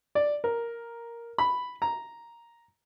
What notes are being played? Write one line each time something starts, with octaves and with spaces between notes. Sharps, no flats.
D5
A#4
B5
A#5